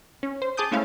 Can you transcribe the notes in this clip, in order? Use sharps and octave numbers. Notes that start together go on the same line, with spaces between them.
C#4
C5
G#4 A5 D6 D#6 G6
G#3 A3 C#4 E4 E5 F5